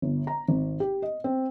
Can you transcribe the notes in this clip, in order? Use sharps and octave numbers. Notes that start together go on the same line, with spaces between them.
G1
A#5
G#1
G4
D#5
C4